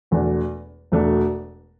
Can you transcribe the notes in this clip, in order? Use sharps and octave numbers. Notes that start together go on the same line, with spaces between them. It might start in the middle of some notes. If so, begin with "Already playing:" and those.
E1 E2 B2 A3 D4
E1 E2 B2 A3 D4